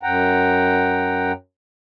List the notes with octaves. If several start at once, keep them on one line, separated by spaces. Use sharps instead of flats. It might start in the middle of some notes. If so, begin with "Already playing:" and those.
F#2 F#5 G5 A#5